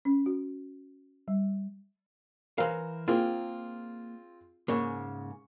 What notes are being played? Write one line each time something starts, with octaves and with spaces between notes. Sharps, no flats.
C#4
F#4
G3
E3 A#4 C5 F5
A#3 C4 F4 G#4
G#2 C#3 A#3 C#6